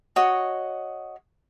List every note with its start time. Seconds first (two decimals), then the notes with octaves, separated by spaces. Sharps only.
0.16 F#4 C#5 D#5